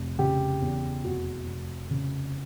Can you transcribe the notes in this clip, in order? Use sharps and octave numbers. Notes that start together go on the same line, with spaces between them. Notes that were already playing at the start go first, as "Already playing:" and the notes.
Already playing: F1
C#3 G4
E2
F1 F#4
F1
C#3